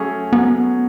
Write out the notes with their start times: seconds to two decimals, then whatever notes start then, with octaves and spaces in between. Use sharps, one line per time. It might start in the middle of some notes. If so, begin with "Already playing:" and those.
Already playing: F#3 A3 C#4 G#4
0.33 F#3 B3